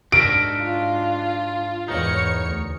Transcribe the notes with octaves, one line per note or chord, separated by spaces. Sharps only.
G#2 D4 F#4 A#4 E5 D7
F4
E2 G#2 D#4 A#4 C#5 C#7
D2